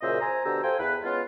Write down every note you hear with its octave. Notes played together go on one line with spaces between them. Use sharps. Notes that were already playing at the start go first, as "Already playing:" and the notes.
F#2 A#2 C#3 C5 D#5 E5
C5 G#5 A#5
B2 D3 G4 C5 A#5 E6
A4 C5 F5 G5 G#5
E2 B4
G#3 B3 C#4 F4